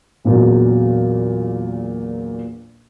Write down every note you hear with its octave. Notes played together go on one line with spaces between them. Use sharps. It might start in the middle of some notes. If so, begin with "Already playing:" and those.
A#1 E2 A#2 F#3